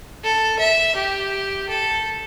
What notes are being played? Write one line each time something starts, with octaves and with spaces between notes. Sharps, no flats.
A4
E5
G4
A4